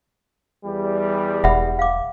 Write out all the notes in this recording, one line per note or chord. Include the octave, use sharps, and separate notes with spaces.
E2 G3
E1 E5 F#5 B5
F5 D6